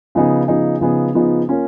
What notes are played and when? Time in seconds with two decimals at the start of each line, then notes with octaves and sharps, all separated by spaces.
0.15 C#3 F3 B3 D#4 G#4
0.48 C#3 F3 B3 D#4 G#4
0.81 C#3 F3 B3 D#4 G#4
1.14 C#3 F3 B3 D#4 G#4
1.48 A#3 C#4 F4